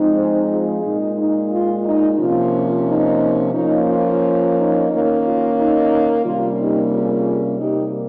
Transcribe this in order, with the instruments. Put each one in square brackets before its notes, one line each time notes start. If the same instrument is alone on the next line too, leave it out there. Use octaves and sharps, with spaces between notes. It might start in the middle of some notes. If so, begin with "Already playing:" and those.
Already playing: [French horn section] F3 G#3 C4 D#4
G#4 C5
F4 G#4
A#2 G#3 D#4
D#4
F4
D#4
C3 F3 A#3 C#4 F4
D#4
F3 A#3 C#4 D#4
F4
D#4
D#3 A#3 C#4
F4
D#4
C3 G3 A#3 C#4 F4
D#4 G4
F4 G#4
C3 G3 A#3 D#4 G4